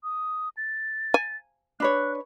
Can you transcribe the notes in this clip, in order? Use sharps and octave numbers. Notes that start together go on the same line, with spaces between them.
D#6
A6
G#5
D4 B4 C#5 F#6